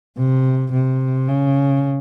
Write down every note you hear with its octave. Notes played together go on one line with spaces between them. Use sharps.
C3
C3
C#3